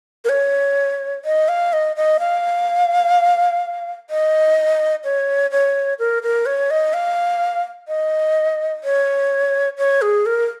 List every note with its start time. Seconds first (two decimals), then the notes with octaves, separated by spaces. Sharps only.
0.25 A#4
0.30 C#5
1.25 D#5
1.48 F5
1.73 D#5
1.96 D#5
2.20 F5
4.10 D#5
5.04 C#5
5.51 C#5
5.99 A#4
6.23 A#4
6.46 C#5
6.71 D#5
6.94 F5
7.88 D#5
8.84 C#5
9.78 C#5
10.02 G#4
10.26 A#4